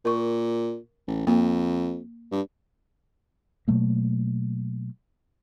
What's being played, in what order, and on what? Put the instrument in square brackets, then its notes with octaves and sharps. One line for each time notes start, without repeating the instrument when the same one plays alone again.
[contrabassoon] A#2 [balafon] A#4 C#6
[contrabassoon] A1
[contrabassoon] F2 [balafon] A#3
[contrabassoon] G2
[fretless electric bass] B2 F#3 A3 A#3